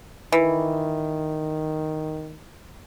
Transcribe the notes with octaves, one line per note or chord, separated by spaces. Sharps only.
D#3 E3